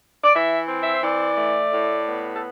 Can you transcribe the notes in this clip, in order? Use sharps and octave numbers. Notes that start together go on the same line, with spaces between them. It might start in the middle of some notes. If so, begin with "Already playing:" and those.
D5
E3 E5
C4
E5
C5
E3 D5
A3
A2
B3
A4